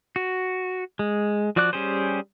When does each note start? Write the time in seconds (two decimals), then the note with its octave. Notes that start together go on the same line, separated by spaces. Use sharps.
0.16 F#4
0.99 G#3
1.56 F3 F#4 D5 D6 F#6
1.73 G3 C#4 G4 G#4 C5